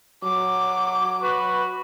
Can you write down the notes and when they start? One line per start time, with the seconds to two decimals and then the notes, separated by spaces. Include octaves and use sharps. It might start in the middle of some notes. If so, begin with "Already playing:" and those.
0.23 F#3 D6
1.22 F#4 B4